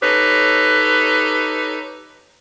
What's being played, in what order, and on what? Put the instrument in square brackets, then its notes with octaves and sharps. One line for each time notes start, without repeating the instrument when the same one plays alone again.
[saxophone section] D#4 G4 A4 B4 C#5